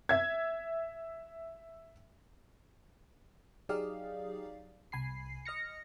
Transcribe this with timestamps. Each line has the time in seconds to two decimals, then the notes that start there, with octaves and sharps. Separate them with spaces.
0.09 E5 G#6
3.69 F#3 D#4 G4 G#4 D5 F5
4.92 C2 G#5 B5 C7
5.46 D#5 F6 A#6 C#7